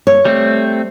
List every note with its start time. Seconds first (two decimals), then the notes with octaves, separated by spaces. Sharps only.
0.07 C#5
0.25 G3 A3 C4